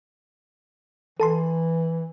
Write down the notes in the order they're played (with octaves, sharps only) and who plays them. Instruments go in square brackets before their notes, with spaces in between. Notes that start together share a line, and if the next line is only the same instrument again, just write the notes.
[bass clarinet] E3 [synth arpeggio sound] A4 A5 C6